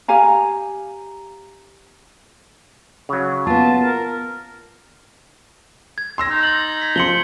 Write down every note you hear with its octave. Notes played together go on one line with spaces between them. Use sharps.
G4 F5 G#5 A#5
C#3 F#3
B3 F4 A5
A#4
G#6
C6 E6 A#6
D#4
G#6 A6 F#7
G#6 B6
F3 C6 C#7 F#7 G7